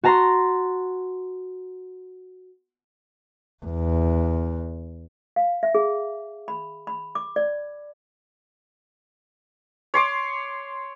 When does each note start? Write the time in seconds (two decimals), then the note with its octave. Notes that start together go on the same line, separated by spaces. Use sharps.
0.04 F#4 A5 A#5 C6
3.65 E2
5.36 F5
5.63 E5
5.75 G#4
6.48 B5
6.87 B5
7.15 D6
7.36 D5
9.94 C#5 C6 D6